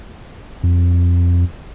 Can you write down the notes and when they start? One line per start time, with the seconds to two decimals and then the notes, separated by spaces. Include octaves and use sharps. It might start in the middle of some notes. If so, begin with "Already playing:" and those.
0.63 F2